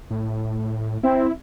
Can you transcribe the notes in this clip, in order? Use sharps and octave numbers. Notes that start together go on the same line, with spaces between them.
A2
C4 E4